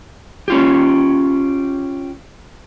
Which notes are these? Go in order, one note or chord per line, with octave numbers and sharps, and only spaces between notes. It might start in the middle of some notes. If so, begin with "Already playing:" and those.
C#4 F4 G4